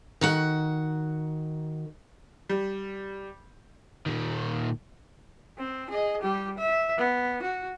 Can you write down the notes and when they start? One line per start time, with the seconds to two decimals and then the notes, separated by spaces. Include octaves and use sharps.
0.21 D#3 F#4 F#5
2.49 G3
4.06 A#2 D#3
5.58 C4
5.90 G#4 D#5
6.22 G3 G4
6.58 E5
6.98 B3
7.42 F#4